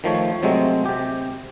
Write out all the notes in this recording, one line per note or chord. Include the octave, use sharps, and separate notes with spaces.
D#3 F3 A3 C#5
C3 F#3 G#3 A3 C4
C3 G4